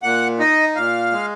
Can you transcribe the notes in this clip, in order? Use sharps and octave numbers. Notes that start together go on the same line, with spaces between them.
A#2 F#5
D#4 D#5
A#2 F5
G#3